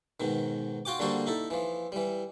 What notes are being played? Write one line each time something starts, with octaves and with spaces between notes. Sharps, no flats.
G#2 B2 D#3
F4 F#4 G5 D6
D3 G3 A#3 F#4 A4 C5
D#4 E4 A4
E3 F3
E3 G3